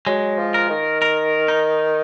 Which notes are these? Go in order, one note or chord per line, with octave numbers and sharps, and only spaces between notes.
F#3 G#3
F3
A#4
D#3
A#4
D#4